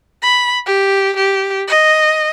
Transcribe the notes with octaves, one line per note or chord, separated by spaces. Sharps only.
B5
G4
G4
D#5